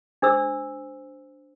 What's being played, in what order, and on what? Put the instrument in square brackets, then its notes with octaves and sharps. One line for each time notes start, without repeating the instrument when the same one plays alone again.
[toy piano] D4 C5 E6